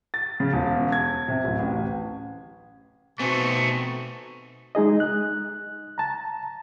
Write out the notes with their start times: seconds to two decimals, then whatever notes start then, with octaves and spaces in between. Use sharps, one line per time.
0.14 A6
0.40 C#3
0.53 E1
0.92 G#6
1.28 C3
1.44 D1
1.59 A1
3.19 B2 A3 B3 C4 D#4 G#5 C#6
4.75 G#3 D#4 G#4 D#5
5.00 F#6
5.98 A5 A#5